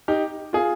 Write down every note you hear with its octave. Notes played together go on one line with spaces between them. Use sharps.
D#4 G4
F4 G#4